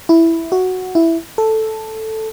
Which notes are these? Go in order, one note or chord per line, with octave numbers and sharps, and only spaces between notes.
E4
F#4
E4
A4